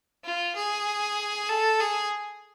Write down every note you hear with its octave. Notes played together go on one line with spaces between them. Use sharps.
F4
G#4
A4
G#4